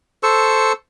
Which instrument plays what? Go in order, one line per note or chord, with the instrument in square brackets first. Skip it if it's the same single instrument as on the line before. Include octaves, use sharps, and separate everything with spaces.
[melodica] A4 C5 C#6 E6